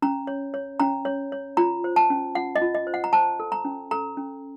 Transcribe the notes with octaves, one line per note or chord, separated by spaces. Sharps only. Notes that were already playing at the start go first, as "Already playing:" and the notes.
C#4 A#5
C#5
C#5
C#4 A#5
C#5
C#5
F4 A#5
C5
A5
C#4
F4 F#5
D#5
F4
D#5
C5
F#5
A#5
C5 A5
A4
A#5
C#4
A4 A#5
C#4